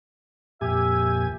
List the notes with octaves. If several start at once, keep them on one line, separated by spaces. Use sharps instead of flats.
F2 A#2 G4 E5 G#5